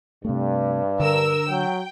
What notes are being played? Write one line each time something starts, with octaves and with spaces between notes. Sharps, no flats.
G2 C3 A3
D3 A#4 E6
F#3 G5